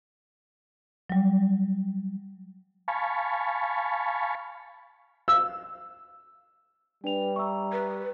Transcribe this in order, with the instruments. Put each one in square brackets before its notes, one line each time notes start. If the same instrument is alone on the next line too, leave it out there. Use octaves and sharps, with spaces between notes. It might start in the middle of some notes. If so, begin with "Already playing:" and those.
[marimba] F#3 G3
[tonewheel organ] F5 G#5 A5 B5 C#6
[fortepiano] E6
[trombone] G3 [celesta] D4 F7 [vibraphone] B4 D5 G5
[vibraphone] E5 A#5 [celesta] C#6 E6
[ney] B4